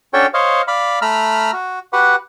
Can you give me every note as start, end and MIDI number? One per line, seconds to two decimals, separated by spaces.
0.13 0.26 61
0.13 0.26 62
0.13 0.26 66
0.13 0.26 69
0.13 0.26 73
0.13 0.26 79
0.34 0.62 72
0.34 0.62 73
0.34 0.62 75
0.34 0.62 77
0.68 0.99 74
0.68 0.99 77
0.68 0.99 83
1.02 1.51 57
1.02 1.51 82
1.02 1.51 83
1.02 1.51 88
1.02 1.51 89
1.53 1.79 66
1.93 2.15 66
1.93 2.15 67
1.93 2.15 71
1.93 2.15 78